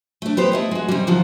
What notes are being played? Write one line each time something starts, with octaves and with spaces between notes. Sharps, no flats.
A3 D4
B3 G4 C5
A3 E4 D#5
G#3 F#4
C3 G3
D#3 F3 F#4